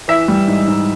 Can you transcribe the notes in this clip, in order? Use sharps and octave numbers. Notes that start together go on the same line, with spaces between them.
E3 E5
G3
G#2
G#2